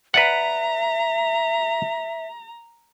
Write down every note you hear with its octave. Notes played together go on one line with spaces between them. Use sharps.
B4 D5 E5 F#5 A#5